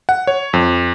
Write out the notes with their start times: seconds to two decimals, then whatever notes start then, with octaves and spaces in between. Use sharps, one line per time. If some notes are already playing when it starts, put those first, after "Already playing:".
0.09 F#5
0.27 C#5
0.53 F2